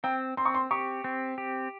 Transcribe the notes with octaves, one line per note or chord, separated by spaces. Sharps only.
C4 G5
C4 C6
C#6
C6
G4 C#6
C4
G4